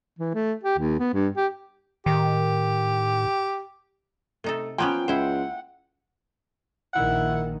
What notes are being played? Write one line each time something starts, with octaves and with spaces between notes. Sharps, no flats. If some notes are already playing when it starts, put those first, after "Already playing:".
E3
A3
G4
D#2
B3
G2
G4
A2 D#3 G4
C3 A3 D#4 A4
F3 A#3 B3 C#4 G5 C6
C#2 E4 C5 F#5
A#1 D#3 E4 F#5